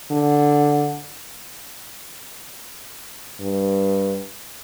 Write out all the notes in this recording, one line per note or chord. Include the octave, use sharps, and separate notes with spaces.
D3
G2